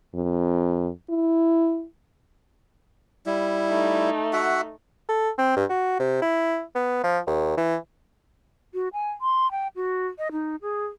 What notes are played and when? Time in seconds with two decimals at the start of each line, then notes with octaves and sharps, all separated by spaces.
0.14 F2
1.10 E4
3.26 G3 E4
3.68 A3 D#4
4.33 F#4 E5 F#5
5.09 A4
5.38 C4
5.56 G2
5.70 F#4
6.00 C3
6.22 E4
6.75 B3
7.04 F3
7.27 D#2
7.57 E3
8.74 F#4
8.93 G#5
9.21 C6
9.51 G5
9.76 F#4
10.18 D#5
10.32 D#4
10.62 G#4